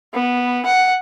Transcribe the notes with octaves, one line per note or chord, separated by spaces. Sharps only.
B3
F#5